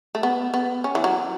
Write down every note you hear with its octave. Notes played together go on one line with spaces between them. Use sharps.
A3
B3
B3
C#4
E3
F#3